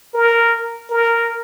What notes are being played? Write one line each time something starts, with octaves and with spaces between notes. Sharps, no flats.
A#4
A#4